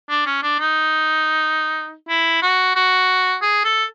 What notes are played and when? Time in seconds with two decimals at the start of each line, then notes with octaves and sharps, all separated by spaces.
0.09 D4
0.26 C#4
0.42 D4
0.59 D#4
2.09 E4
2.42 F#4
2.75 F#4
3.42 G#4
3.64 A4